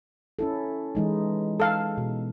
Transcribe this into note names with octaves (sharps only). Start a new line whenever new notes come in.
C#4 E4 A4
E3 G#3 D#4
A4 F5
B2